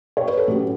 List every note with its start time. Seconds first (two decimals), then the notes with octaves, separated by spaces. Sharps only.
0.17 C#5
0.28 B4
0.37 A4
0.48 A2 F#3 C#4 G4